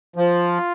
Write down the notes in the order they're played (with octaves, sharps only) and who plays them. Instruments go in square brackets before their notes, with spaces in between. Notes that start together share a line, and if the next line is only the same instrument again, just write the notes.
[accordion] F3 [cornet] F4